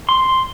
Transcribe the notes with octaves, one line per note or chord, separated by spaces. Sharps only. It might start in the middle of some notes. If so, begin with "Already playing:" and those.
C6